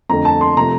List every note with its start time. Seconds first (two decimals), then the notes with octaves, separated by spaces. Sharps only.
0.09 F2 D3 A3 A#5
0.25 A5
0.41 C6
0.57 C3 F3 A3 A#5